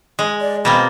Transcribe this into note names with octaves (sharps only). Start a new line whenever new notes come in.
G#3
D5
B2 A#3 C4 B5